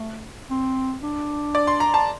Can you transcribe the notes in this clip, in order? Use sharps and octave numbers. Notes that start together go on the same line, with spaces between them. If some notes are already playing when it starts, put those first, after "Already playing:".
Already playing: A3
C4
D4
D5
C6
A#5
A5